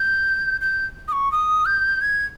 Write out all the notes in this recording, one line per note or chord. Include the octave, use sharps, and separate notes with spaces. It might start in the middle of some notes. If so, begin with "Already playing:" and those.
Already playing: G6
G6
D#6
C#6
D#6
G6
G#6